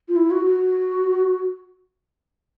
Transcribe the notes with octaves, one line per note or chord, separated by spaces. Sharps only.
F4
E4
F#4
F#4